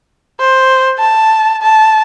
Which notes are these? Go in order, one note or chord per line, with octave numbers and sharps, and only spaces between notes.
C5
A5
A5